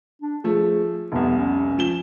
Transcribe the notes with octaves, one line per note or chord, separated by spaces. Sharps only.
D4
F3 A3 G#4
F1 C2 B3
C#4
F3 E7 G7